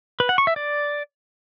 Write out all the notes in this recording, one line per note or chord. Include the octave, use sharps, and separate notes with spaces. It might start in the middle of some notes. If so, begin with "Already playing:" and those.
B4
F#5
C#6
E5
D5